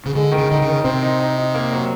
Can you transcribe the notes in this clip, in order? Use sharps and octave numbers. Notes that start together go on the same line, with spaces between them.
C#3
D3 G#3
D#3
C#3
D3 D#4
C#3
D#3
C3 C4
D#4
D#4
D#4
A#3
F#3